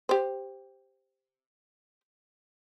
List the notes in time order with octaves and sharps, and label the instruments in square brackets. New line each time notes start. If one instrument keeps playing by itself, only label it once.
[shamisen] G4 C5